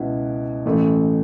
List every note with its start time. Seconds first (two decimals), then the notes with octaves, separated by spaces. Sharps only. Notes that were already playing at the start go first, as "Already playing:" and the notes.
Already playing: C#2 B2 B3 E4
0.65 A1 A2 A3